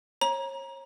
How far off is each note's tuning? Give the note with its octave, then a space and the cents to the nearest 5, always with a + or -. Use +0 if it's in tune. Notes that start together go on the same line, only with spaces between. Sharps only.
C#5 -35 A#5 +20